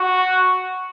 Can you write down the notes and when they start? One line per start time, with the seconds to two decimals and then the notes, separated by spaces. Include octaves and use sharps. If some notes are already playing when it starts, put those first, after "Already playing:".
Already playing: F#4